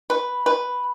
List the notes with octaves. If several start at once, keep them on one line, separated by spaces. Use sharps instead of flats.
B4
B4